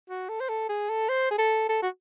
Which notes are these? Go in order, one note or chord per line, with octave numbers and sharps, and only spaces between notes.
F#4
A4
C5
A4
G#4
A4
C5
G#4
A4
A4
F#4